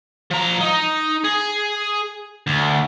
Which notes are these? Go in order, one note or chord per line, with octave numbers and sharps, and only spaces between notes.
F3 A#5
D#4
G#4
D2